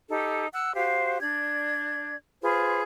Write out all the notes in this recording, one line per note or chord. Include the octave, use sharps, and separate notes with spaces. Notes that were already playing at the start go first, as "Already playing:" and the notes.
D#4 G4 A4
F#5 E6 F#6
F#4 G4 C5 F5
D4 D5 G#6
F4 G#4 B4 C5